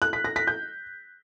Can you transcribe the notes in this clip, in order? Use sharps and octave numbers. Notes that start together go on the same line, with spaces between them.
F#6
B6
A#6
B6
G6